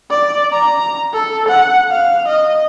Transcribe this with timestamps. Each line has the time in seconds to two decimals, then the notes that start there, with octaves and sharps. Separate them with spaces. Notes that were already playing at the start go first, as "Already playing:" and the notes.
0.10 D5
0.52 A#5
1.13 A4
1.48 F#5
1.91 F5
2.28 D#5